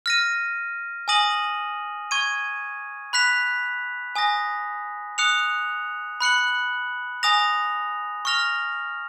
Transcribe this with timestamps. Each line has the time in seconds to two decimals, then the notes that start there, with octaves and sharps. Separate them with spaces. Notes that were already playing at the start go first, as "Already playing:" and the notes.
0.06 F6 A#6 D#7
1.08 G#5 D#6 A#6 D#7 F#7
2.11 C#6 G#6 D#7
3.13 B5 F#6 B6 F7
4.16 G#5 D#6 A#6
5.18 D#6 F#6 C#7 F7
6.21 B5 F#6 C#7 F#7
7.23 G#5 D#6 A#6 F7
8.25 C#6 F6 A#6 F7